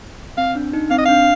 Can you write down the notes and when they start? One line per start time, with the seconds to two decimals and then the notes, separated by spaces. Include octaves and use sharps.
0.37 C4 F5
0.55 D4
0.73 D#4
0.91 C4 F5
0.98 D#5
1.06 D4 F5